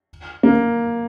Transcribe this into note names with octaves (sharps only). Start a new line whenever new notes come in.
A#3